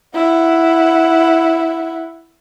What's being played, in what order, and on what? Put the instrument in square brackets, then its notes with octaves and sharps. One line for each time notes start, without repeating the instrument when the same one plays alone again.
[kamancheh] E4 F#5